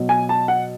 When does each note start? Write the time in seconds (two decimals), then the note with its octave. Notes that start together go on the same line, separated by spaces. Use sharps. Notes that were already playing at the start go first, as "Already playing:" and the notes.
Already playing: B2 F#3
0.09 G#5
0.29 A5
0.48 F#5